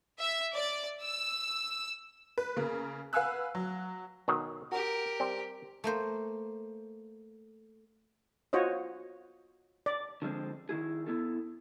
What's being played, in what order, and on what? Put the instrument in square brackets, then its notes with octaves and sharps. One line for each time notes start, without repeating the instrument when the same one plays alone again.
[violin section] E5
D5
E6
[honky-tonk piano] B4
C#3 A#3
B4 F5 F#5 G#5 E6 F#6
F#3
[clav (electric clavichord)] B1 D#3 F#3
[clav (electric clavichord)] F#4 [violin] G4 A#4
[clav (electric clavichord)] G3 C4
[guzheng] A3 A#3 C5
[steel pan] F4 F#4 C5 C#5 D#5
D5
[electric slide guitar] D3 F3 G#3 C4
D#3 F3 E4 G#4
B3 E4 A4